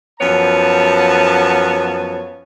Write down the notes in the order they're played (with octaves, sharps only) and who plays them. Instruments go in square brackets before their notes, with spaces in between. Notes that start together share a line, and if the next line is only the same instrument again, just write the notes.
[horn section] F#2 F3 B3 C#5 A5